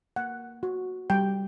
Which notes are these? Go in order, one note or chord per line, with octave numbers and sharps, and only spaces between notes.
A#3 F#5
F#4
G3 G5